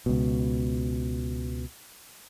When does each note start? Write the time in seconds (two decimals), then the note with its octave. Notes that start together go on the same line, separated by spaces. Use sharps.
0.06 C#2 B2